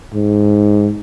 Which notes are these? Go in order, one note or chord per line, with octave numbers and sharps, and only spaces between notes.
G#2